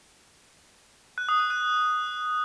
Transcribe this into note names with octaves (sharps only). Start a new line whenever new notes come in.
F#6
D#6
F#6
F#6